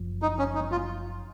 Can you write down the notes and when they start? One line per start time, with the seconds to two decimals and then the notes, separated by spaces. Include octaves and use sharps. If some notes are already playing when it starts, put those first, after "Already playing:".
Already playing: F#1 F#2 F3
0.22 D#4
0.39 C#4
0.55 D#4
0.72 F4